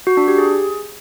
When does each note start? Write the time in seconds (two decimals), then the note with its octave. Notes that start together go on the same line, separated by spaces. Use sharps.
0.07 F#4
0.17 D4
0.28 G4
0.38 G#4